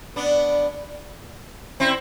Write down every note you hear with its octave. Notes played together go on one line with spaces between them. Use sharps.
B3 D4
C4 E4